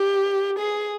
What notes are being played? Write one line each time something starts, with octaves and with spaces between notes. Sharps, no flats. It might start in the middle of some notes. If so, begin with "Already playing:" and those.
Already playing: G4
G#4